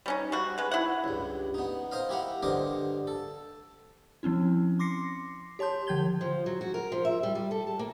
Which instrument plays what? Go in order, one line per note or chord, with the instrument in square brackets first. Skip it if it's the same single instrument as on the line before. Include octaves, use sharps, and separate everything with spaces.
[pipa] G3 C#4 D#4
G3 F#4
G#3 B4
E4 F#5
[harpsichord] C#2 G2
B3 D#4
A#4 C5 D#5 F5
E4 G4 A#4 F5 F#5
G2 D3 A#4 C5 D#5 D6
A4
[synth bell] F3 C4 C#4 E4
C6 D6 A#6 C7 C#7
G4 C#5 A5 C6 G6
D3 F3 G5 G6 G#6 G7
[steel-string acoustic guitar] F3
F#3
F#4
A#4
F3
E5
G3
G3
A4
A5
A#3